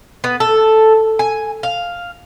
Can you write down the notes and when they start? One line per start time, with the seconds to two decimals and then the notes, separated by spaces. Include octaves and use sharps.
0.24 B3
0.40 A4
1.19 G#5
1.63 F5